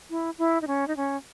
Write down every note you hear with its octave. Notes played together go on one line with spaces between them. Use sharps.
E4
E4
D#4
C#4
D#4
C#4